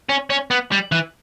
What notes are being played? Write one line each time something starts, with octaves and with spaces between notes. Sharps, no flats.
C#4
C#4
B3
G3
E3